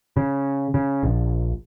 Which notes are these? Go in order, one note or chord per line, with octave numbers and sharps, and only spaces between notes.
C#3
C#3
A#1